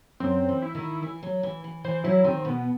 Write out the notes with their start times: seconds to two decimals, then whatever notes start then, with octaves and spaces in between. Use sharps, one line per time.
0.20 F#2 C4
0.49 E3
0.62 E4
0.75 D#3
1.03 E3
1.23 F#3
1.43 E3
1.64 E3
1.84 E3 C5
2.04 F#3 E4
2.24 D#3 C4
2.45 B2 B3